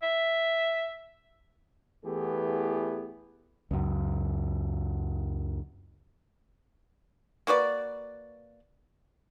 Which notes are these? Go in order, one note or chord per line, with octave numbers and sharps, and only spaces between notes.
E5
E2 E3 A3 B3 G4 G#4
C#2 F#2
A#3 F#4 B4 D5